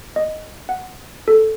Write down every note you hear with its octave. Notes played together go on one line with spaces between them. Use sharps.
D#5
F#5
A4